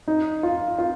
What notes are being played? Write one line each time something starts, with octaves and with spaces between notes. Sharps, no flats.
D#4
F4
F4